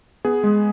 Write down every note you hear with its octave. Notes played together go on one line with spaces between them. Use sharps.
B3 G#4
G#3